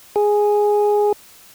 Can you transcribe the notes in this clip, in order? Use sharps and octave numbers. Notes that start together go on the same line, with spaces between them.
G#4